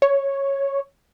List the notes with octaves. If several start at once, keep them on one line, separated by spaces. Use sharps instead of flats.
C#5